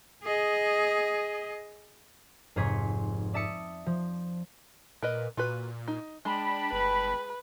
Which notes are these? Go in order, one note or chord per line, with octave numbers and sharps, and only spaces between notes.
G#4 D#5
F1 G#2 F4 G#4 C#5 B6
D5 E5 A5 D#6 C#7
F3
A#2 A#4 B4 D#5
A#2 F4 F#4 B4
D#4
G#3 D4 G5 A5 B5
G1 B4